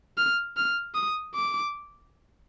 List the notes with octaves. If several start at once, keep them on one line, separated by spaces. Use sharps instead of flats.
F6
F6
D#6
D6